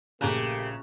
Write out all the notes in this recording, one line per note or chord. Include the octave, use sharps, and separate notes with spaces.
A#1 C#3 A3 A#3 G4 A#5 F#6